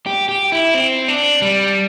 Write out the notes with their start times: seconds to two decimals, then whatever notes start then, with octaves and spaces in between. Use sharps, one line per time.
0.06 G4
0.29 G4
0.52 E4
0.74 C4
1.08 D4
1.42 G3